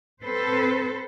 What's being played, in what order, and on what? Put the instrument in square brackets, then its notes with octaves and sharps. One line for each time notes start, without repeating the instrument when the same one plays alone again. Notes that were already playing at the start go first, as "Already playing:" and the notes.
[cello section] C4 A4 B4 C5